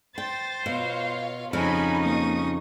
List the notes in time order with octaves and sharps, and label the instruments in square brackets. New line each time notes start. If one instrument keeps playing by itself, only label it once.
[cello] C5 [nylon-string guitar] G5 [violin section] A6
[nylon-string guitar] B2 [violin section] F4 C#5 F5
[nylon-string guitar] F2 C#3 F3 [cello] C#4 D#4 [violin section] D#5 G#5 B5
[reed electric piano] A#3 [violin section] C#6 D#6